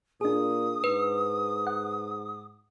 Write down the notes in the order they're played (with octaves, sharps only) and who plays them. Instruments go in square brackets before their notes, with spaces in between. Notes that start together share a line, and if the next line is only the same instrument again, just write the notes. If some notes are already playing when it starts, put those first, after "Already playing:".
[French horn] A#2 [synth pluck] D4 G#4 [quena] D#6
[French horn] G#2 [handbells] B4
[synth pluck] F#5